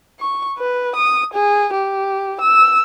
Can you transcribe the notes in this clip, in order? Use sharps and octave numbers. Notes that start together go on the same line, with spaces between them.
C#6
B4
D#6
G#4
G4
E6